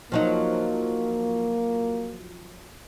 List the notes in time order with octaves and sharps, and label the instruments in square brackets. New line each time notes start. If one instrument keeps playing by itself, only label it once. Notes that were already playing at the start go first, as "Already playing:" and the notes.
[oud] F3 F#3 D#4 [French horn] A#3